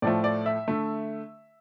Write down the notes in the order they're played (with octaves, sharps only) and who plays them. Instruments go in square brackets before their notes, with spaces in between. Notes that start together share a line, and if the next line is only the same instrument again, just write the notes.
[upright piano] A2 F3 A3 D5
D5
E5
D3 A3